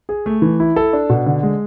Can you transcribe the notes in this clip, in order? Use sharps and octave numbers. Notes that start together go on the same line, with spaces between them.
G#4
A3
E3
E4
A4
D4
B2
D3
G#3